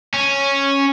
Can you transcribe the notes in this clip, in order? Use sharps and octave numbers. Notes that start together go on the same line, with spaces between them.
C#4